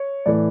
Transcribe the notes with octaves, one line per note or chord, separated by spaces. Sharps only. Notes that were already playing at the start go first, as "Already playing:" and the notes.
Already playing: C#5
A2 E3 A3 D5